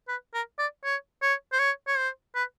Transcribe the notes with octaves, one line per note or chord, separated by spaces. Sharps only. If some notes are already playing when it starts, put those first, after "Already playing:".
B4
A#4
D5
C#5
C#5
C5
C#5
C#5
C5
B4